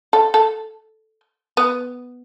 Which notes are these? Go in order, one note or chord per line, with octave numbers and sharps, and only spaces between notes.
A4
A4
B3